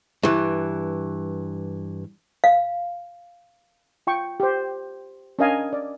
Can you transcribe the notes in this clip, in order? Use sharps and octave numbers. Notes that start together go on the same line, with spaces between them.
G2 E3
F5
F4 G5 C#6
G4 C5
C#4 D4 A#4 D#5 F5 G#5
D5